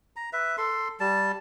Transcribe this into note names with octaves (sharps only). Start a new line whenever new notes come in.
A#5
B4 E5
A4 C6
G3 A5